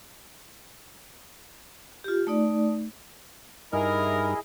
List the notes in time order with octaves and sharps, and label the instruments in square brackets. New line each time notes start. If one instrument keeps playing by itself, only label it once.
[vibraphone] F4 G4
A3 D#4 D5
[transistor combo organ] G2 D#4 [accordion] E4 G#4 D#5 [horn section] A#4